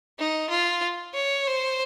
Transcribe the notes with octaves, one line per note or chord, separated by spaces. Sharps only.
D#4
F4
C#5
C5